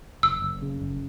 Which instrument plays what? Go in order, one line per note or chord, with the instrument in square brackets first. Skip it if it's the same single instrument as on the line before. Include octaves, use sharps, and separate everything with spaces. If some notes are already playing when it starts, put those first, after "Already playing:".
[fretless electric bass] F#1 [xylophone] E6
[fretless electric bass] F#1
C#3
F#1